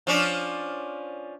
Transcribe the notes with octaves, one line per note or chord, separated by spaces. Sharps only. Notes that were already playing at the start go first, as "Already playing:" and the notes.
F3 C#4 D4